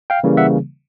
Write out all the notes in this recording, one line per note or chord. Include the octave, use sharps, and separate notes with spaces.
F5 G5
C#3 E3 G3 A#3
E5 F#5